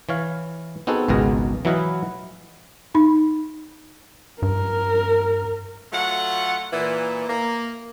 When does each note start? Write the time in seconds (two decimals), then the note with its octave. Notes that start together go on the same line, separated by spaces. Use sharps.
0.09 E3 C#5 F5
0.87 B3 C4 D#4 F#4 G#4 A4
1.08 G#1 C#2 B2 G#4 A#4 A#5
1.65 E3 F#3 E4 B4 D#5 F5
2.95 D#4 B5
4.42 G2 A#4
5.92 F#3 A3 F4 F#5
6.72 A#2 E3
7.27 A#3